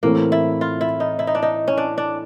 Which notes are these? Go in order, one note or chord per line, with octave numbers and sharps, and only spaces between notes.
A2 E3 A3 A#3 C4
E4
F4
E4
D#4
E4
D#4
D4
D#4
C#4
D4
D4